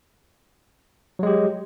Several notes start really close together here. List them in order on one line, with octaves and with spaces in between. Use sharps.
F#3 G#3 G4